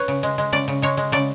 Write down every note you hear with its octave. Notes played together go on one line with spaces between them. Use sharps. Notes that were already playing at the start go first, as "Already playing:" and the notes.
Already playing: B4 C#5
C#3
G#3
G#3
C#3 D5
C#3
G#3 C#5
G#3
C#3 D5